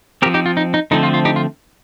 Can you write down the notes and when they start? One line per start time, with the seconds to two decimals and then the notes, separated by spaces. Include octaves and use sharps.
0.22 C4 G4 A#4
0.26 F3
0.34 D#4 G4
0.46 F4
0.57 D#4
0.74 D#4
0.91 D3 F3 A3 C4 D#4
1.03 F4
1.14 F4
1.25 D#4 G4
1.36 F4